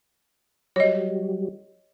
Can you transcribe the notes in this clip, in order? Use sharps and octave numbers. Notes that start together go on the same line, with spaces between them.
F#3 G3 C#5 D#5